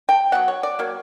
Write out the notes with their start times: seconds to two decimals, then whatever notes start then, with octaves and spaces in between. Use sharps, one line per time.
0.09 G5
0.32 F#3 B3 F#5
0.48 C#5
0.63 D5
0.79 F#3 A#3